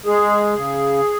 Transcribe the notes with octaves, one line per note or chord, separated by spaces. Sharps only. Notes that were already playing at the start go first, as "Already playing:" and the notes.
G#3 G#4
C#3